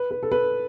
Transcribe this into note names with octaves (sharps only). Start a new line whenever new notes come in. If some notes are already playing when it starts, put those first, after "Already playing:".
Already playing: B4
B4
A4
B4